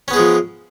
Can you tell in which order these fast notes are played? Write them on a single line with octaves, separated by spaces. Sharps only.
C#4 B3 G#4 G#3 F3